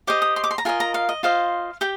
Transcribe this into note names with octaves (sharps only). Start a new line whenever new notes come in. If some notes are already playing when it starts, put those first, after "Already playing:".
G4 C5 D#5 D6
D#6
C6
D6
C6
A#5
F4 A#4 D#5 G#5
A#5
F5
D#5
F4 C5 D#5 F5
G4 G5